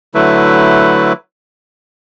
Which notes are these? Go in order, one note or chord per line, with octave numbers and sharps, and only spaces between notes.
D3 F#3 A3 E4 B4